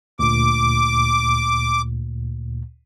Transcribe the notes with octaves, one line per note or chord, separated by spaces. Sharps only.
D2 A#2 D6